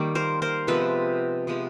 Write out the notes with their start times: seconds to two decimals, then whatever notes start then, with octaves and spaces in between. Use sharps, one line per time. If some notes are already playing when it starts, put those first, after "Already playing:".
Already playing: D#3 G3 A#3
0.15 A#4 C5
0.42 A#4 C5
0.67 C3 F3 G#3 B3 A4 B4
1.47 C3 F3 G#3 B3